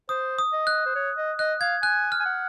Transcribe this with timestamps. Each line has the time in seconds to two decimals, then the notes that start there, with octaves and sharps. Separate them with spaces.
0.09 C5 D#6
0.38 D#6
0.53 D#5
0.67 F#6
0.86 C5
0.95 C#5
1.17 D#5
1.39 D#5 F#6
1.61 F5 G#6
1.83 G#5 F#6
2.12 F6
2.20 G#5
2.26 F#5